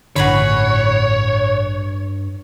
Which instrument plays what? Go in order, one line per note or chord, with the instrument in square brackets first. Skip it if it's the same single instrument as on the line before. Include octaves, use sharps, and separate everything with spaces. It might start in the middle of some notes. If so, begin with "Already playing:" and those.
[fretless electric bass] A1 D3 [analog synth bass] G2 [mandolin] F#4 G#4 B5 [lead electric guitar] C#5